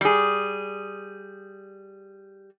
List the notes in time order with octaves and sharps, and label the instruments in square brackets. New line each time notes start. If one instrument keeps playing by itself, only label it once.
[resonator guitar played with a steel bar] G3 G#4